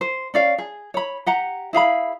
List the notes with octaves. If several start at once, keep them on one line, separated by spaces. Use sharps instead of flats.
C5
C#4 D5 F5
G#4
C#5 B5
G4 F#5 A#5
E4 G#4 F5 B5